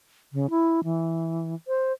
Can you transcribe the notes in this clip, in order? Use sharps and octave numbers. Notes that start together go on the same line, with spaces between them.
C#3
E4
E3
C5